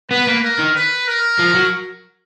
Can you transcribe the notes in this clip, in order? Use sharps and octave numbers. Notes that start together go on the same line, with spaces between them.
B3 B4
A#3
A#4
D#3
B4
A#4
F3
F#3